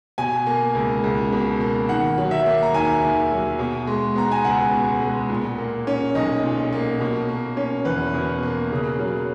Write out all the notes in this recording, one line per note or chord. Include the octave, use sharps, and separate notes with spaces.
B2 G#5
A#3
C#2
C#2
B2
A#3
D#3 F#5
F#3
E5
A#3
A#5
D#2 G#5
D#3
F#3
B2
G#3
B3 A#5
G#5
C#2 F#5
B2
G#3
A#2
A#3
C#4
B1 D#5
A#2
A#3
B2
A#3
C#4
E2 B4
B2
A#3
C#3
F#3